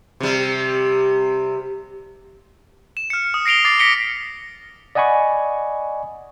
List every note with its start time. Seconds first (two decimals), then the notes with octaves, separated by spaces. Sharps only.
0.20 C3 G3
2.97 E7
3.10 F6 C#7
3.34 D#6
3.46 A#6 C7 D7 F7 G7
3.65 D6 A6 C7
3.79 A#6 B6 C#7 D7 G7
4.95 D5 D#5 F#5 G#5 B5 C#6